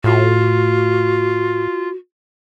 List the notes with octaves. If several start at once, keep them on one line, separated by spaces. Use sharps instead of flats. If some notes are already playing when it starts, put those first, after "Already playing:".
A2 F4 F#4